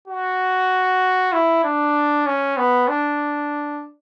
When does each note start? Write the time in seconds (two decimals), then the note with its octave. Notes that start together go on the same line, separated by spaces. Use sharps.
0.08 F#4
1.33 E4
1.64 D4
2.26 C#4
2.58 B3
2.88 D4